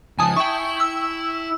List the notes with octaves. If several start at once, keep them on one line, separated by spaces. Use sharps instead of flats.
C#3 F3 G#5 A5 D#6
E4 E5 G5 C#6
E6